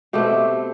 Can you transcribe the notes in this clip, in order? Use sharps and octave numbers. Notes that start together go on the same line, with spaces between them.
B2 A3 C4 G4